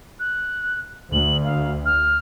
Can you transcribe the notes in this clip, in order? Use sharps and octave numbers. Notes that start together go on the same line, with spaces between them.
F#6
D2 F#7
F5
F6